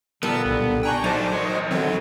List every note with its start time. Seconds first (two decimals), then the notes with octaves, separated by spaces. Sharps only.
0.23 A#2 D3 G3 B3 A#4 A5 E6
0.45 B1
0.83 D4 G5 G#5 A#5 C#6 F#6
1.04 F#3 D#4 A4 C5 D5 A5 A#5
1.33 E2 D#3 C#5 D#5
1.71 D3 D#3 F#3 C4